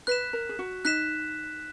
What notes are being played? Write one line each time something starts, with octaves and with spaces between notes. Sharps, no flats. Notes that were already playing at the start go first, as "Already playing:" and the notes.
B4 F#6 B6 E7
A#4
G#4
F#4
D#4 F#6 B6 E7